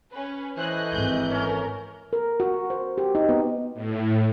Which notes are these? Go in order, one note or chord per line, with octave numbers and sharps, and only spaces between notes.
C#4 B4
A2 E3 C5 D#5 G#5 F#6
G#1 G6
A3 C#4 A#4
A#4
F#4
C5
G4
D#4
B3
A2